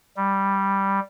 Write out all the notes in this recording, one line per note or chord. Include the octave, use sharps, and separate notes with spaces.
G3